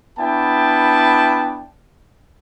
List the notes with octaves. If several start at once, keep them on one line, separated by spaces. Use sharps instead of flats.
B3 D4 E4 G5 A5